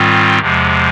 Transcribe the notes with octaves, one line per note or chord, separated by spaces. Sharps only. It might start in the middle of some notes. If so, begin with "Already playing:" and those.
Already playing: G#2 D#3 G3 C4 F4
E2 C3 F3 G#3